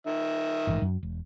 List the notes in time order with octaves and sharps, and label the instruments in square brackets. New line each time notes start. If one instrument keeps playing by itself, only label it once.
[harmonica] D#3 E5
[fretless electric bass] A1 G#2 E3
F#2 F#3
E1